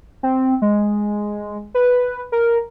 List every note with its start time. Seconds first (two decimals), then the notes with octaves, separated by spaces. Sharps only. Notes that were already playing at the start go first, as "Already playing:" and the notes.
0.23 C4
0.62 G#3
1.74 B4
2.32 A#4